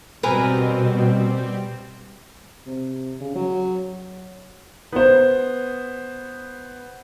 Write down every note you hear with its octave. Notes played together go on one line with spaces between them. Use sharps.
B2 G3 C4 A#4 B4 G#5
C3
C#3
F#3
B3 C5